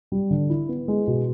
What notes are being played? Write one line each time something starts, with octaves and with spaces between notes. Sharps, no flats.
G3
D3
E4
B3
G#3
B2